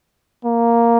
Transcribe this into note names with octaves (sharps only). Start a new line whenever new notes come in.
A#3